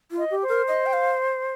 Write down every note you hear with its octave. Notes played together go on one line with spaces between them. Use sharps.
F4
D#5
G4
C5
A#4
D#5
G5
F5